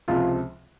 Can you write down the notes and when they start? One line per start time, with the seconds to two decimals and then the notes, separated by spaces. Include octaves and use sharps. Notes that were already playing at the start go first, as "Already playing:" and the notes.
0.08 C#2 C3 F3 F4